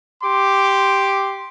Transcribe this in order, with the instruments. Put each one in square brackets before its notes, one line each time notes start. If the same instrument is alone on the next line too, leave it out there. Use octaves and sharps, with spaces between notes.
[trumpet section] G4 C6 D6